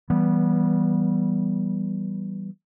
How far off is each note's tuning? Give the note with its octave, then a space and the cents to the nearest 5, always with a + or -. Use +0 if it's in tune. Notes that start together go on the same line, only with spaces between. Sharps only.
E3 +0 G3 -15 B3 -20